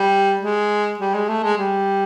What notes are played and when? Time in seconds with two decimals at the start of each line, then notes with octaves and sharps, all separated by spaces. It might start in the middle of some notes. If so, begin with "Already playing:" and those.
Already playing: G3
0.41 G#3
1.00 G3
1.14 G#3
1.28 A3
1.44 G#3
1.58 G3